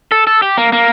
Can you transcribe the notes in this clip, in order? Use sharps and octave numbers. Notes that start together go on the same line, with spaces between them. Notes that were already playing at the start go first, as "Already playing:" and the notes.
A4
A4
G4
A#3
A#3